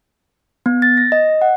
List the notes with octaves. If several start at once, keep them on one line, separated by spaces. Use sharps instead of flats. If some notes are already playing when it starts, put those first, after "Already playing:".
B3
A6
A#6
D#5
F#5